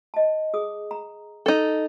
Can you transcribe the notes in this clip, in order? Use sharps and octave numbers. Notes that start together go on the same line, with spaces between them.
D#5 A5
G#4 D#6
A#5
D#4 A4